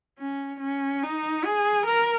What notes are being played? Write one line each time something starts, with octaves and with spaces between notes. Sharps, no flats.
C#4
C#4
D#4
G#4
A#4